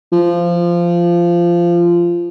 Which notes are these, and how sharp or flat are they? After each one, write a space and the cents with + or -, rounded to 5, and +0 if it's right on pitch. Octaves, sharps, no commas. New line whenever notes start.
F3 -15